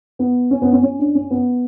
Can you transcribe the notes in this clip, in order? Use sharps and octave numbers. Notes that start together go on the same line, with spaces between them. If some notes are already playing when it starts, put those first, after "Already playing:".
B3
C#4
B3
C#4
C#4
D4
C#4
B3